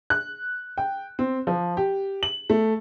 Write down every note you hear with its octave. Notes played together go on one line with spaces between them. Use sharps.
F#6
G5
C4
F3
G4
F#7
A3